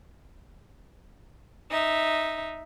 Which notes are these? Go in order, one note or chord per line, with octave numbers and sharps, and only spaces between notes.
D#4 E5